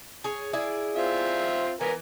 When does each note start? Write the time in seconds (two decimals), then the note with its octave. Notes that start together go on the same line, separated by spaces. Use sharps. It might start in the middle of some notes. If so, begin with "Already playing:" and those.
0.24 G#4 C#5
0.53 E4 G#4 D5
0.96 C4 F4 E5
1.81 E3 B3 A#4 G#5